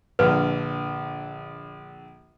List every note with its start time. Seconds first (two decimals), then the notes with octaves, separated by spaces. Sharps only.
0.19 A#1 D3 B4